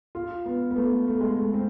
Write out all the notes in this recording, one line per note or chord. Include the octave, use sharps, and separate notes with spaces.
F4
B3
B3
A3
A3
G#3
A3
C4